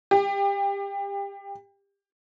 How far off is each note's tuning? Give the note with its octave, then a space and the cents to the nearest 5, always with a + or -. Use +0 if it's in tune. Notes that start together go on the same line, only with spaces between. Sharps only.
G4 +25